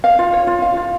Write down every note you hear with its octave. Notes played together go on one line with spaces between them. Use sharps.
F5
F4
C#5
F4
F5
F4